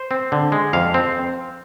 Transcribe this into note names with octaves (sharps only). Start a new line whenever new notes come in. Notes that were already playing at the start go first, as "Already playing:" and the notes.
Already playing: C5
C4
D3
G#3
F2 F5
C4